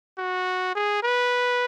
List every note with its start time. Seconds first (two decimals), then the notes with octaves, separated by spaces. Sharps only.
0.18 F#4
0.75 G#4
1.03 B4